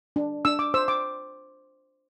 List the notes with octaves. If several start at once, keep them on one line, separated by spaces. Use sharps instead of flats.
D4
D4 E6
D6
C5 E6
D6